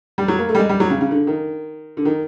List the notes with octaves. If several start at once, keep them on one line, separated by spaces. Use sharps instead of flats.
G3
F#3
A#3
A3
G3
G#3
G3
F#3
C#3
C#3
D3
D#3
D3
D#3